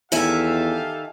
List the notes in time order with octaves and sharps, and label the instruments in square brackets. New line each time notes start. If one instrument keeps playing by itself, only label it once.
[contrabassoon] E2 [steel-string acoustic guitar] D#3 E5 G#5 [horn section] G4 A4 F5